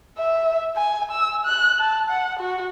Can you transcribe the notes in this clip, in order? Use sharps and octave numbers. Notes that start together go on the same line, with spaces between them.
E5
G#5
E6
F#6
A5
F#5
F#4